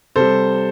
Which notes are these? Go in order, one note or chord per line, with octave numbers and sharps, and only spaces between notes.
C3 G3 A4 C5